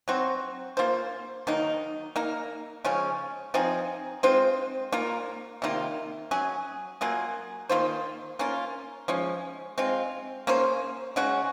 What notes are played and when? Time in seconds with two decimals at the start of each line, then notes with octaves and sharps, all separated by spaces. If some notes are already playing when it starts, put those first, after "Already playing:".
0.08 F#3 C4 F#4 C5
0.77 A#3 F4 C5
1.47 D#3 F#3 A#3 D#4
2.16 A#3 D#4 A#4
2.85 C#3 F3 G#3 C#4
3.54 F3 C4 D#4 G#4
4.23 G#3 C4 F4 C5
4.92 A#3 F4 A#4
5.62 C3 D#3 A#3 F4
6.31 F#3 C#4 G#4
7.01 F#3 A#3 F4 G#4
7.69 D#3 A#3 F4 C5
8.39 A#3 C#4 F4
9.08 F3 G#3 C#4
9.78 G#3 C4 F4
10.47 A#3 C#4 G#4 C5
11.16 C#3 G#3 C#4 F#4